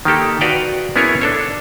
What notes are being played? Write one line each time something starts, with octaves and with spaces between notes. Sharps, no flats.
D#3 A#3 G4 A4
F#4 B4 D5 F5 G5
B3 C#4 E4 G#4 A#4 C#5
D4 A4 C#5